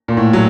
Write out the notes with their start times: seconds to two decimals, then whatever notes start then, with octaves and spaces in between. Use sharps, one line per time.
0.08 A#2
0.17 A2
0.33 F#3